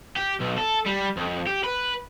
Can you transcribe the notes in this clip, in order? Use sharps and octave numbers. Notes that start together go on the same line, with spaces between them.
G4
B1
A4
G3
F2
G4
B4